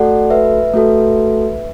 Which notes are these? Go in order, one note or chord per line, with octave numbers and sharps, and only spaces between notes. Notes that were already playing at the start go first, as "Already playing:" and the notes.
Already playing: A3 F#4 A4 D5 F#5
B4 E5
A3 F#4 A4